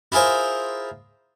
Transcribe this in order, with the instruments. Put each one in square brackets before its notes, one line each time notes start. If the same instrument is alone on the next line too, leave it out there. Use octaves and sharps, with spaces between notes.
[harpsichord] E4 F4 G#4 A#4 C5